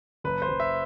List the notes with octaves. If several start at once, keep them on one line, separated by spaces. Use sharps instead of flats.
F#1 B4
C5
F#1
E5